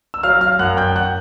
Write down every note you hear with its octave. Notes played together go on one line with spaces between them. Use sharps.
E6
F#3 F5 F6
F5 F6
F#2 F#5 F#6
G5 G6
F#5 F#6